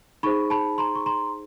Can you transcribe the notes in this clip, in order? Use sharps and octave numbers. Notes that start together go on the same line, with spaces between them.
D#4 G#4 C5 B5 C#6
A5 B5
A#5 C6
C#6
A#5 C6